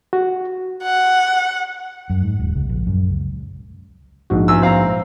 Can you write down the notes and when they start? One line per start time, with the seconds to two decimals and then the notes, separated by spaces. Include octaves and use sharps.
0.13 F#4
0.83 F#5
2.10 F#2
2.23 G#2
2.39 D#1
2.55 C#2
2.69 A#1
2.87 F#2
3.10 C#2
4.30 A#1 G#2 F#4
4.48 E2 E6
4.62 C4 F5 A#5